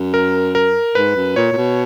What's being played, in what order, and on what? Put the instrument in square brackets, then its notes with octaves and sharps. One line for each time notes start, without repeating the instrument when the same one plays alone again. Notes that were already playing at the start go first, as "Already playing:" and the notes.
Already playing: [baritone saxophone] F#2
[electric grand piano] A#4
A#4
[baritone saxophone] G#2 [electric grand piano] B4
[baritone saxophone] F#2
[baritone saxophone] A#2 [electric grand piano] C#5
[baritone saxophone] A#2
B2